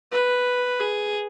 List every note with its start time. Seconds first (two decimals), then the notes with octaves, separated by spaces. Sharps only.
0.12 B4
0.80 G#4